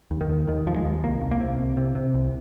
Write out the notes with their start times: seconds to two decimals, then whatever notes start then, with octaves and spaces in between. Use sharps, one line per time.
0.11 D#2
0.21 D#3
0.29 D#2
0.47 D#2 D#3
0.67 D#2 F3
0.76 G#3
0.85 D#2
1.03 C2 A#3
1.22 C2
1.31 A#3
1.40 C3
1.59 C2
1.77 C3
1.95 C3
2.14 C2